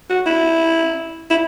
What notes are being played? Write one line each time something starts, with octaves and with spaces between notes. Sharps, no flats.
F#4
E4
E4